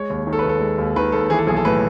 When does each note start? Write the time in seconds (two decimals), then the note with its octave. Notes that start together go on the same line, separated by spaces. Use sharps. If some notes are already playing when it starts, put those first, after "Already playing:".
Already playing: G#3 C#5
0.10 D#2
0.27 D#3
0.33 A4
0.39 B4
0.44 D#2 A4
0.61 G#3
0.78 D#2
0.96 D#3 B4
1.12 D#2 A4
1.30 E3 G#4
1.38 A4
1.47 B1 G#4
1.57 A4
1.65 A2 B4